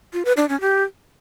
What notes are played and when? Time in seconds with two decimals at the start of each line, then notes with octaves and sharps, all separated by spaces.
0.13 F4
0.25 B4
0.37 D4
0.49 C#4
0.61 G4